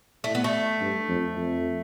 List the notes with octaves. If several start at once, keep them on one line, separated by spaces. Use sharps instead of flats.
A2 A3
B3
A3
G2
F2
F2